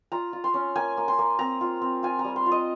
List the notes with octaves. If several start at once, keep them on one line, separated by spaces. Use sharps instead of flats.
F4 A#5
F4
C6
C#4
A#3 G#5
A#3
C6
A#3
C4 A#5
F4
C4
F4 G#5
A#5
G3
C6
F4
D#5